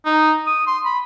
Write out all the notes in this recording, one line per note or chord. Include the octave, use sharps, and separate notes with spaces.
D#4
D#6
C6
B5